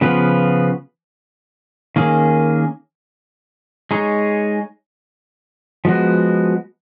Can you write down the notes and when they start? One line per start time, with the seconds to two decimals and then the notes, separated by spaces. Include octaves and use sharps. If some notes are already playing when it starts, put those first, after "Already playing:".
0.01 C#3 F3 B3 F4 B4
1.96 D#3 A#3 C#4 G#4
3.91 G#3 D#4 G#4 C#5
5.85 F3 G#3 B3 F#4